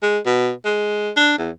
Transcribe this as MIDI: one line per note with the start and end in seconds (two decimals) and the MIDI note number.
0.02 0.19 56
0.26 0.51 47
0.65 1.10 56
1.17 1.36 62
1.39 1.50 40